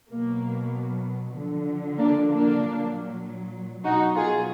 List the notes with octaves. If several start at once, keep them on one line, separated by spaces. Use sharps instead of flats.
B2 F#3 A#3
D3 F3
A#3 D4
A#3 D4
A#2 F#3
B2 F#3 D#4 F#4
F4 G#4